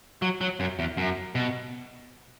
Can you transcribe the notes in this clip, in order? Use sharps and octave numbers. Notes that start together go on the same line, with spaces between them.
F#3
F#3
F#2
E2
F#2
B2